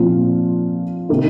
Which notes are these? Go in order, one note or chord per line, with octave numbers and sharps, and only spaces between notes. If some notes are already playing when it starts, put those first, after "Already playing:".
Already playing: A#2 F3 C4 F4
C3 D#3 A#3 D#4